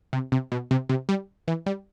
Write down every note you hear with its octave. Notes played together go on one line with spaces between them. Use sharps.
C3
C3
B2
C3
C3
G3
E3
G3